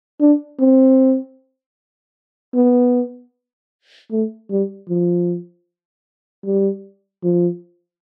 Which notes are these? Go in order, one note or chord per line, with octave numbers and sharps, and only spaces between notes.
D4
C4
B3
A3
G3
F3
G3
F3